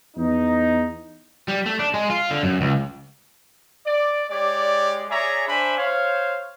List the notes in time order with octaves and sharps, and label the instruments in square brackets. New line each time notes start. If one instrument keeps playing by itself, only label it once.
[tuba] E2 [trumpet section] D#4
[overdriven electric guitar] G3
A3
D4
G#3
F4
D3
F#2
C#2
[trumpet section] D5
G#3 G4 C#5 D5
G#4 C#5 D5 E5 G#5 A#5
D4 C5 E5 G#5 B5
C5 C#5 F5